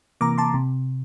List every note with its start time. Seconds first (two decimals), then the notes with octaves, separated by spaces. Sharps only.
0.21 C3 E3 A#3 A#5 D6
0.38 A5 C6
0.54 C3